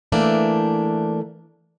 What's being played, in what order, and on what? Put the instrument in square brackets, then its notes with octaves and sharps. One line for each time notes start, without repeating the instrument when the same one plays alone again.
[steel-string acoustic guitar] E3 A3 A#3 D4